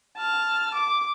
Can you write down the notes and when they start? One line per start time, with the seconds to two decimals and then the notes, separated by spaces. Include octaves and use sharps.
0.17 A5 F6
0.75 D6